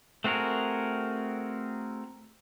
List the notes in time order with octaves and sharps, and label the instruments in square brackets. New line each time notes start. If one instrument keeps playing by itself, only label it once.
[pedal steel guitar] A3 C4 F#4 G#4 A#4